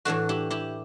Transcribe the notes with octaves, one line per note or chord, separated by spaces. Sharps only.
A2 E3 A3 D4 F#4
E4 G4
E4 G4